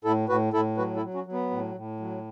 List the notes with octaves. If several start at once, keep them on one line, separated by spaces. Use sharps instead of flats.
A2 E4 A4
A2 F#4 B4
A2 E4 A4
F#3 F#4 B4
E4 A4
F#3
C#4 F#4
F#3
B3
A2
A2
F#3